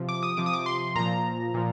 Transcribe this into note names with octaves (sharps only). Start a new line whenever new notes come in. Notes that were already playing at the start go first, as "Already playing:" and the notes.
Already playing: C3 F3
D6
D#6
C3 F3 D6
D#6
D6
C6
A#2 F3 A#5
A#2 F3